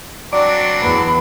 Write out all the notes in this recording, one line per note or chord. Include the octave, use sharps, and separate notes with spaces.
F#3 C4 D4 D5 D6 D7
E2 B3 B5